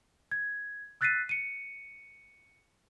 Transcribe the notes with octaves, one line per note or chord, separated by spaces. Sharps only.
G#6
E6 F#6 A6 B6 C7 D#7
C#7 D#7